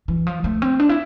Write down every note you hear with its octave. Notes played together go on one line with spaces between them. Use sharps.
E3
F3
A3
C4
D4
E4